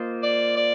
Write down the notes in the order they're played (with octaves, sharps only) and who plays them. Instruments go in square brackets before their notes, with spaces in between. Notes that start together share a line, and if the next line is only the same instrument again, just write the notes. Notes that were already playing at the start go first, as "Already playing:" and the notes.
Already playing: [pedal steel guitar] A#3 F4 C5 D#5
[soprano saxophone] D5
D5